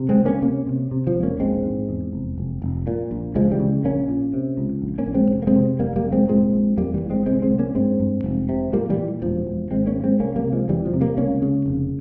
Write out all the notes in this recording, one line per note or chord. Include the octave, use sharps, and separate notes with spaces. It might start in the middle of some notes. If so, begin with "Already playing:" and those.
Already playing: C3
G#3 C4
C#2
A#3 C#4
C3 A#3 C#4
C3
C3
F3
E1
A#3 C#4
A#1 G#3 C4
G#2
E2
F1
F1
F1
A#2
A#1
C#2 F3 G#3
E3 G3
C#3
A#1 A#3 C#4
A#2
C3
C#2
A#1
A#3 C#4
A#1
G#3 C4
F1
A#3
G#3 C4
C3
F1 G3 A#3
G3 A#3
F1
G#3 C4
A#2 G#3 C4
A#1
F2 G3 A#3
E3 G3
G1
G#3 C4
C2 G#3 C4
G#3 C4
C2
A#3 C#4
G2 G#3 C4
G2
F1
C3
A#2 G3 A#3
E3 G3
A#2
E1 F3
E1
G#1 G#3 C4
A#3 C#4
G2
G#3 C4
C2 A#3 C#4
G3 A#3
C3
F3 G#3
E1 E3 G3
F3
C3
G3 A#3
C#2 A#3 C#4
C#3
F1